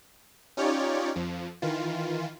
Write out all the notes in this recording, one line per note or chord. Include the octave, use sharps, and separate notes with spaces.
C#4 D#4 F4 G4 C#5 D5
F2 F3
D#3 E3 F4